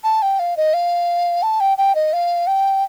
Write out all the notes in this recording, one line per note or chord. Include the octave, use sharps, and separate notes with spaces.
A5
G5
F5
D#5
F5
A5
G5
G5
D#5
F5
G5